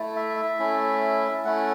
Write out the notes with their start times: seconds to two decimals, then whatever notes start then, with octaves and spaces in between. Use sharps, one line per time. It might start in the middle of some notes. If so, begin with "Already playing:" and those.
Already playing: A3 E4
0.16 E5
0.37 E5
0.59 A3 C#4 E4
1.45 A3 C#4 E4 F#5